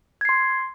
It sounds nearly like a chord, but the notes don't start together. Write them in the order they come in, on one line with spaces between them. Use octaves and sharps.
G#6 C7 C6